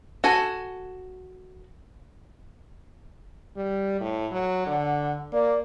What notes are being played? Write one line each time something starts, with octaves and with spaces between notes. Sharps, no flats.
F#4 A4 G#5
G3
A2
F#3
D3 F#5
A#3 D5